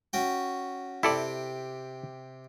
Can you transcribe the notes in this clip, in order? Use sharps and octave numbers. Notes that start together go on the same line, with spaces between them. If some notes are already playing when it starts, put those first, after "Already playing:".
C#4 F#4 G5
C3 E4 G4 A4 D5